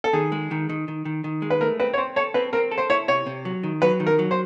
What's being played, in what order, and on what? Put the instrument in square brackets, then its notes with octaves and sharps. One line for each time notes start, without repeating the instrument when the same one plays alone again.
[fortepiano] A4
[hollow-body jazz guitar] D#3 [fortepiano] G#4
[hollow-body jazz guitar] G#3
D#3
D#3
D#3
D#3
D#3
G#3
[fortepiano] B4
[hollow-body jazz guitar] A3 [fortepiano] A#4
[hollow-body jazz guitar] C4 [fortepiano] B4
[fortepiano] C#5
[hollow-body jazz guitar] C4 [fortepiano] C5
[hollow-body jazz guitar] A4 [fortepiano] C#5
[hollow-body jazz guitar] C4 [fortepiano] B4
[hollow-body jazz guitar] C4 [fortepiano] A#4
[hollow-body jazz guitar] A4
[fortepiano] C5
[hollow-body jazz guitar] E4 [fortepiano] C#5
[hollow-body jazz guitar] C3 [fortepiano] C#5
[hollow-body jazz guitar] C3
F#3
D#3
[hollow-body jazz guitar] F#3 [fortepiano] B4
[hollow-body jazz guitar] D#3
[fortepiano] A#4
[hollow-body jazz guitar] F#3
[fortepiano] C5